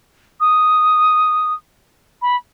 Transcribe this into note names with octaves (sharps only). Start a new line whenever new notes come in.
D#6
B5